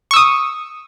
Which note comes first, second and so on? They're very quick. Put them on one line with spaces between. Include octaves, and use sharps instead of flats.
C#6 E6 D#6